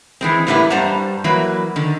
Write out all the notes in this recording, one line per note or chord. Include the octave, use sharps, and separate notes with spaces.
E3 G#3 C4
A2 G3 A#3 B3 D#4 E4
G2 G3 C5 F#5 A5 A#5
E3 F#3 A#3 B4
D3 D#3